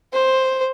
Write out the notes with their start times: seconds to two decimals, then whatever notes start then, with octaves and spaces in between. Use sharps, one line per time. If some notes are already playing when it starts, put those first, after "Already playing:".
0.13 C5